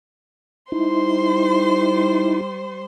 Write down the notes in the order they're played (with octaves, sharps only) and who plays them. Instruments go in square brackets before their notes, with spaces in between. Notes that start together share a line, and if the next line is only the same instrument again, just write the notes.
[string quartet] G3 C5 C6 [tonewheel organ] D#4 E4